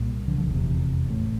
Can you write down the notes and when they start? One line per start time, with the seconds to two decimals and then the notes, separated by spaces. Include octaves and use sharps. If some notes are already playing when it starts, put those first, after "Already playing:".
Already playing: C2 A#2
0.28 D3 F3
0.38 D3 F3
0.48 F1 E2 C3
1.07 A1 A2